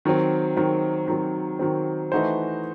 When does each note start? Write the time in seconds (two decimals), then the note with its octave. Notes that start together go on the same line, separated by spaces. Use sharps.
0.05 D#3 F#3 C4
0.57 D#3 F#3 C4
1.08 D#3 F#3 C4
1.59 D#3 F#3 C4
2.12 E3 A3 D#4 F#4 C5